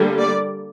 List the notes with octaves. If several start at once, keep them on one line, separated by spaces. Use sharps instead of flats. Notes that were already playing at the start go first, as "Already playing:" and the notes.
Already playing: D3 G3 A#3
D5